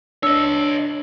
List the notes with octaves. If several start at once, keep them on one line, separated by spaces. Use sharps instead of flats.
D4 C#5 D#5 E6